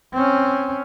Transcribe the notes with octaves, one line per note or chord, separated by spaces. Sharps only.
C4 C#4